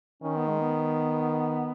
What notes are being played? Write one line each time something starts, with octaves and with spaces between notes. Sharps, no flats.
D#3 C#4
B3
G#3
B3